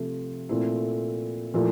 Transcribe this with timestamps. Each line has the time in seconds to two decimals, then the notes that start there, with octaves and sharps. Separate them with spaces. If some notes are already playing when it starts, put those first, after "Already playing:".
Already playing: C3 F3 A3
0.49 A#2 A3 C4 E4
1.54 A#2 F3 A3 E4